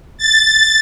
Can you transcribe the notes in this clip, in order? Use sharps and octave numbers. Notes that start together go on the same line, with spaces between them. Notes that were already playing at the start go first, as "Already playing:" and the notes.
A6